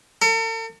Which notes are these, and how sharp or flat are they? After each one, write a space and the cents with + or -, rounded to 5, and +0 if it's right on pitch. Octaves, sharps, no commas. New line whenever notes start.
A4 +45